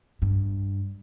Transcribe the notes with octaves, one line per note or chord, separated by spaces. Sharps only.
G2